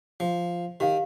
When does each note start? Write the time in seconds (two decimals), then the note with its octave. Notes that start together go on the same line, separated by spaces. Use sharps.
0.20 F3
0.80 D#3 G4 F5